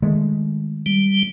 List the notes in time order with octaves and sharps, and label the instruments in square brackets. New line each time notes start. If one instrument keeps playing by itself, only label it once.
[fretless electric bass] D#3 G#3 A3
[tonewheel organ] G3